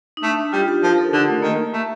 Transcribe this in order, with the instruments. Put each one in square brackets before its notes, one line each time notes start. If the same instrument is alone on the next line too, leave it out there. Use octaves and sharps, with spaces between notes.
[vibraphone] D#4
[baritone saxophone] A3 [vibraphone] D4
[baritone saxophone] G3 [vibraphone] F4
[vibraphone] G4
[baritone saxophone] F3 [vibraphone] A#4
[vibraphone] A4
[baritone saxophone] D3 [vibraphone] D#4
[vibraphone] A3
[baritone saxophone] D#3 [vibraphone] A#3
[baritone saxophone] A3